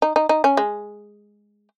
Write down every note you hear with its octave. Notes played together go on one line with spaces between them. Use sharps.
D#4
D#4
D#4
C#4
G#3